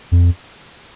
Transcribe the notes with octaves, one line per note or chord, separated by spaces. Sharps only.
F2